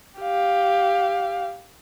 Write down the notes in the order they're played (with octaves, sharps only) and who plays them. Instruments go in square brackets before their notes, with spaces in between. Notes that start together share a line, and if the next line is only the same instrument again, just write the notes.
[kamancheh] G4 F5